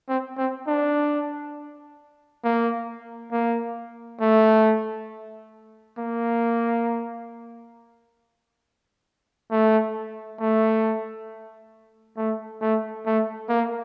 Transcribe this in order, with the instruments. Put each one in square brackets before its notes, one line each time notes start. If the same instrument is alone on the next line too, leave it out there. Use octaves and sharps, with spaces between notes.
[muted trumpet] C4
C4
D4
A#3
A#3
A3
A#3
A3
A3
A3
A3
A3
A#3